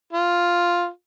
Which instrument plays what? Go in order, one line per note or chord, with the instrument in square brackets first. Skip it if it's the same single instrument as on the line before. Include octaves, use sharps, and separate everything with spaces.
[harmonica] F4